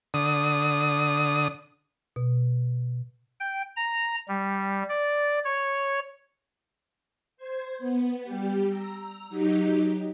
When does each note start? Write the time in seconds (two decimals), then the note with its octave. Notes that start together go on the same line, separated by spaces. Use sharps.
0.14 D3 D#6
2.16 B2
3.40 G5
3.76 A#5
4.28 G3
4.89 D5
5.45 C#5
7.37 C5 G#6
7.79 B3
8.24 G3 G4
8.69 A#5 E6
9.29 F#3 D#4 G4